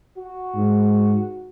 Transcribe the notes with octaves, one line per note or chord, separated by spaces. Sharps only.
F#4
G#2